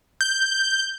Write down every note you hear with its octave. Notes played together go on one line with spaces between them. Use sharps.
G6